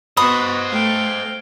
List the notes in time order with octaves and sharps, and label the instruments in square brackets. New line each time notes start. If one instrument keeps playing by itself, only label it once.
[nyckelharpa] B3 F#4 [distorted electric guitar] C5 D#5 [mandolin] B5 D#6
[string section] A3 [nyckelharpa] F5 G5